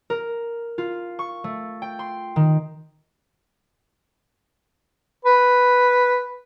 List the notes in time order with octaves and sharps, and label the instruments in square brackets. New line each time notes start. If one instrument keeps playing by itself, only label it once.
[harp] A#4
F4
C#6
A3
G5
C6
D#3
[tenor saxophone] B4